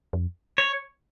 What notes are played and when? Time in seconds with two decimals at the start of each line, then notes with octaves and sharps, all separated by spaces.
0.13 F2
0.58 C#5